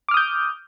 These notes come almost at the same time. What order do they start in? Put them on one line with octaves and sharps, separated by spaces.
D6 F6 D#6 G6